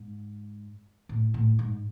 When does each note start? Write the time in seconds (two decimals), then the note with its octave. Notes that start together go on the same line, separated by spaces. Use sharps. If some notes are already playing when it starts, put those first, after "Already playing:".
Already playing: G#2
1.09 A2
1.34 A2
1.59 G#2